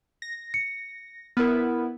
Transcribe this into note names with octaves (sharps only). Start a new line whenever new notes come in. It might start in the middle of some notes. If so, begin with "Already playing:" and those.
A#6
C#7
B3 E4 A#4 F6